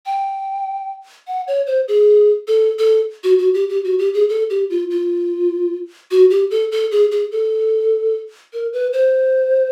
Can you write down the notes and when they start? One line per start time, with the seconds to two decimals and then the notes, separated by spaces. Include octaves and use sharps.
0.06 G5
1.27 F#5
1.47 C#5
1.67 C5
1.88 G#4
2.48 A4
2.79 A4
3.24 F#4
3.38 F#4
3.54 G4
3.69 G4
3.84 F#4
3.99 G4
4.14 G#4
4.29 A4
4.50 G4
4.70 F4
4.90 F4
6.11 F#4
6.30 G4
6.51 A4
6.72 A4
6.91 G#4
7.11 G#4
7.32 A4
8.53 A#4
8.73 B4
8.93 C5